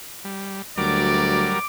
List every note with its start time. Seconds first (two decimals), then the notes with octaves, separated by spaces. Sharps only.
0.25 G3
0.78 D2 F#3 G3 A#4 D5 D6